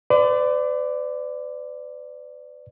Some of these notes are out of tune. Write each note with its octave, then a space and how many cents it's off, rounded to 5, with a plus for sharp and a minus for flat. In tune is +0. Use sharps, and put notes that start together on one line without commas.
B4 +45 D5 +0